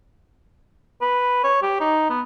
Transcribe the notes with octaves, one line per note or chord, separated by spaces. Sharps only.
B4
C#5
G4
D#4
B3